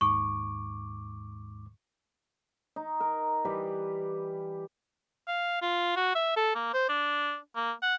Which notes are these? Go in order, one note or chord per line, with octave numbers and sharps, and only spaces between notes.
D#2 G#2 C#6 D6
D#4
A#4
E3 G3 G4 B4
F5
F4
F#4
E5
A4
A#3
C5
D4
A#3
F#5